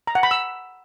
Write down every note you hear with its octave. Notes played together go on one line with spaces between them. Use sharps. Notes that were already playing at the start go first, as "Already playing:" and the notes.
A#5
F#5
B5
E6